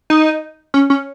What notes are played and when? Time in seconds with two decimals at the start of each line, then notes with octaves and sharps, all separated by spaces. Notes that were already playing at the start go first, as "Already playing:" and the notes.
0.10 D#4
0.74 C#4
0.90 C#4